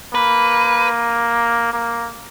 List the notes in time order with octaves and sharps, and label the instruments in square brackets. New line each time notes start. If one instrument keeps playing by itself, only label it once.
[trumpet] A#3 [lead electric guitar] B4
[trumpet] A#3